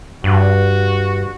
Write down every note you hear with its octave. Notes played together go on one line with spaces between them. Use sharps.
G2 F#4